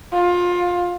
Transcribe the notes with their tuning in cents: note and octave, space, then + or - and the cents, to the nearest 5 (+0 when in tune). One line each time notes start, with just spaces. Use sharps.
F4 +20